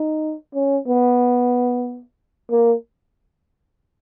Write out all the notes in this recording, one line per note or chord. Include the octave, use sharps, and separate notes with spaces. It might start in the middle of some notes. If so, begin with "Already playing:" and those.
Already playing: D#4
C#4
B3
A#3